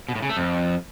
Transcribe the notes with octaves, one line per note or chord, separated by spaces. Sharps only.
B2
A2
C#3
A3
F2